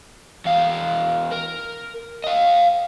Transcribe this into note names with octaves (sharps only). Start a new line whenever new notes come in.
E2 F5
A#4
D#5 F5